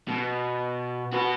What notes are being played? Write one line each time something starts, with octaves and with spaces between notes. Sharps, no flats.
B2
F#4 B4